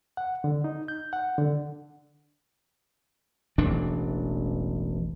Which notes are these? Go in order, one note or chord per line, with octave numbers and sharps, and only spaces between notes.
F#5
D3
D#4
G6
F#5
D3
E1 A1 E3 D4